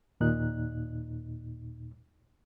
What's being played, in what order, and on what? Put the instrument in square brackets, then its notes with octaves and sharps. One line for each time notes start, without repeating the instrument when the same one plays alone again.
[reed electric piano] D#2 A#2 D#4 F#6